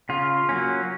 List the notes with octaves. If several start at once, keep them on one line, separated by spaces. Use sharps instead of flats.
C#3 F4
F#3 A#3 C#4